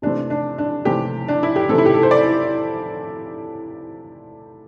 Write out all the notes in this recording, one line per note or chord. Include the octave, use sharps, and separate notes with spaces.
C3 E3 A3 C4 D4
D4
D4
C3 E3 A3 C4 G4
D4
E4
G4
C3 E3 A3 C4 A4
E4
G4
A4
C5
D5